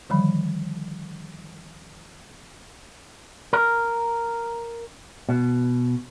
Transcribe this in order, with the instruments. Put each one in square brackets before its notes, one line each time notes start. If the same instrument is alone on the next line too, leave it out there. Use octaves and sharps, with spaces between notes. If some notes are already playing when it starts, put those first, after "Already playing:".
[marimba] D3 D#3 F3 G3 B5
[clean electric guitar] A#4
B2